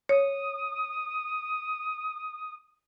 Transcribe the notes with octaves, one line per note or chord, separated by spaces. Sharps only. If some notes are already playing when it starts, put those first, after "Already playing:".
C#5 D#6